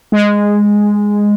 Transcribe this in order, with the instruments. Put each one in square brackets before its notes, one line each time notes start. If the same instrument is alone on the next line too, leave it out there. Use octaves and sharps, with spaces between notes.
[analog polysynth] G#3